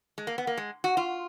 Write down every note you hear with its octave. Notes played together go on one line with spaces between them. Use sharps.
G#3
A#3
B3
A#3
G#3
F#4
F4